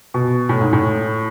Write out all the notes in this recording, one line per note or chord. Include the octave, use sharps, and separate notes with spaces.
B2
A2
G#2
A2